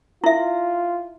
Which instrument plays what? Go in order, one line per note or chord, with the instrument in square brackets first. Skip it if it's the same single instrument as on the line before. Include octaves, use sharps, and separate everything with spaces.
[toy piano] E4 E5 [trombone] F4